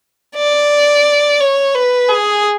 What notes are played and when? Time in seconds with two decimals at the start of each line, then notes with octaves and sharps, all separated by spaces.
0.36 D5
1.40 C#5
1.74 B4
2.09 G#4